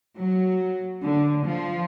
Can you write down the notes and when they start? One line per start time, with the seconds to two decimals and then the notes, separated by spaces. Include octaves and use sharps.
0.17 F#3
1.02 D3
1.45 F3